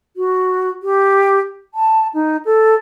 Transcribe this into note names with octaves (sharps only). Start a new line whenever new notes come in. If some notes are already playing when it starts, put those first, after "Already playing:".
F#4
G4
A5
D#4
A4